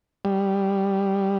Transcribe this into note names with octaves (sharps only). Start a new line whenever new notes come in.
G3